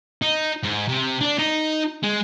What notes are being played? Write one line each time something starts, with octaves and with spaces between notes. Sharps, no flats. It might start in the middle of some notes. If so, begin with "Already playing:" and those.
D#4
G#2
C3
D4
D#4
G#3